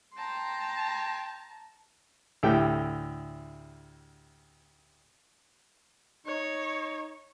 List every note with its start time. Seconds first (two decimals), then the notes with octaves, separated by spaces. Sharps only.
0.17 G5 A5 A#5 C6
2.43 D2 A2 G4 G5
6.26 D#4 C#5